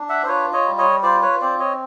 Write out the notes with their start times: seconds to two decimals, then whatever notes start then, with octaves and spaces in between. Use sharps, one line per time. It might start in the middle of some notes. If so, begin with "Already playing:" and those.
Already playing: D4
0.09 E5 F#5
0.23 C5
0.28 F4 B4 C#5
0.53 C#5 D#5
0.66 G3
0.78 C#5 D#5
1.03 F4 C5 D5
1.22 B4 C#5
1.41 C4 C5 D5
1.59 C#5 D#5